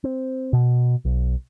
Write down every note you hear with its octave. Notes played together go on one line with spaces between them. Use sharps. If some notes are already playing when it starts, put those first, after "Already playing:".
C4
B2
B1